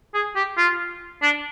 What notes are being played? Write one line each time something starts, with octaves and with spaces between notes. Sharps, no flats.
G#4
G4
F4
D4